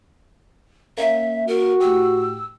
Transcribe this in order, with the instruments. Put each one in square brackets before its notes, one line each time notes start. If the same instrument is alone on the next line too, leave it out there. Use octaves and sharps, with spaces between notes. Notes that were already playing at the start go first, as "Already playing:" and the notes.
[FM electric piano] A#3 C#4 [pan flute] E5
[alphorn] F#4 [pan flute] A#4
[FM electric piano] A2 G4 [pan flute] E6